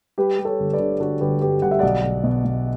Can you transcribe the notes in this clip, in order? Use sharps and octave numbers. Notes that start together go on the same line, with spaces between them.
G3 G4 B4
G3
A4 C#5
G1
B4 D5
D3
D3 F#4 A4
G1 G4 B4
G2 G4 B4
G1 F#5
E5
B1 D5 F#5
B1
B2
B2